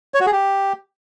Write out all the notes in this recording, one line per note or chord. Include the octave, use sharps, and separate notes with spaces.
C#5
F#4
G#4
G4